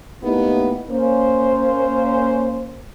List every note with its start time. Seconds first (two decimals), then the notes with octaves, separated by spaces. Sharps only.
0.22 A2 A#3 B3 D#4 E4 G4
0.90 A#3 C#4 C5